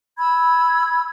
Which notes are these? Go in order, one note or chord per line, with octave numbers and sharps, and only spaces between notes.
B5 E6 G#6